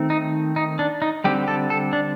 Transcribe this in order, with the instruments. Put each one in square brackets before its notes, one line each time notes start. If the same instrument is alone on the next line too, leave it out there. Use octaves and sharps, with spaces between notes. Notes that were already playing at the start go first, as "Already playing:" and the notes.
Already playing: [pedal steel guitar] D#3 A3 C4
D#4
D#4
D4
D#4
D3 G3 C4 G4
A4
A4
D4